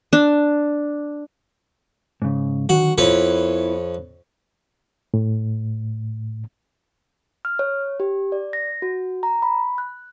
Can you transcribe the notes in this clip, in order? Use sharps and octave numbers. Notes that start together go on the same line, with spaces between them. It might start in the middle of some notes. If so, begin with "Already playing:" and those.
D4
G#2 C#3
D3 D#3 F#3 F#4
F2 B3 E4 B4 C#5
A2
F6
C#5
G4
D5
A#6
F#4
A#5
B5
F#6